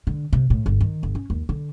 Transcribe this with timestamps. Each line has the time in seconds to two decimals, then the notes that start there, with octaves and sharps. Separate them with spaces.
0.07 D3
0.33 C3
0.50 A2
0.66 G1
0.81 D#3
1.03 G1
1.15 C#4
1.30 D#2
1.49 D3